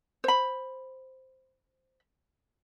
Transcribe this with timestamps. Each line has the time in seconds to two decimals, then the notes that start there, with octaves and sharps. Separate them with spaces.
0.24 C5 B5